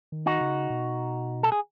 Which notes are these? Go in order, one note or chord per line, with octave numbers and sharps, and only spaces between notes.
D#3
D#4 F#4
C#3
B2
A4
G#4